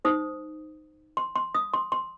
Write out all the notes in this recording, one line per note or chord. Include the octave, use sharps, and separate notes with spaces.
D#4 C5 D#6
C6
C6
D#6
C6
C6